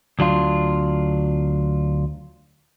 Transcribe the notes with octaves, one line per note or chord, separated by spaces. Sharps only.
D2 F#3 D4 F4